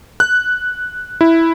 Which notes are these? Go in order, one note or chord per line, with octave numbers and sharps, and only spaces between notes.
F#6
E4